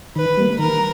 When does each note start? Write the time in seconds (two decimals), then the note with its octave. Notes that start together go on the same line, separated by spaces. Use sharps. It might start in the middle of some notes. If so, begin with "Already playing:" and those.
0.16 D#3 B4
0.37 G3 A#3
0.59 D#3 A#4